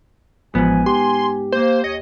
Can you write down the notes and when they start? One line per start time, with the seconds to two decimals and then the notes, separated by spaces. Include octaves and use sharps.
0.55 A1 G#2 F3 B3 G#5
0.86 G4 C6
1.52 A#3 C5
1.84 D#2 C#5 D#5